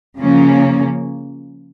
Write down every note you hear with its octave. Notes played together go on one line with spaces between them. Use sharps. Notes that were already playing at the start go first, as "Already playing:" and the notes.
C#3 F3 A#3 C#4